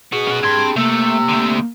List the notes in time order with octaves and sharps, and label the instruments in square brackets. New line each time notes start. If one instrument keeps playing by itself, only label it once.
[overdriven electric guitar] B3 F#4 [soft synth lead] G#4
[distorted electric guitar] C#4 F#5
[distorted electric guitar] G2 [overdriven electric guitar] C4 C6 [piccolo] G#6
[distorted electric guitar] C3 [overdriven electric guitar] A3 A4 [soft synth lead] A#3 [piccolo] E6
[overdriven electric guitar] D3 A3